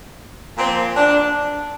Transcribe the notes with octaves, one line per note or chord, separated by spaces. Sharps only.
A#2 F3 C4
D4